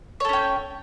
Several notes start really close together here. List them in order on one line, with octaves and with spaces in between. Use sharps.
C#5 A4 C#4 G5